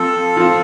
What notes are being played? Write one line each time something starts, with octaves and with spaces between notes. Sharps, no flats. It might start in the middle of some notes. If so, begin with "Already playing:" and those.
Already playing: F3 C4 F4 A4
F3 C4 F4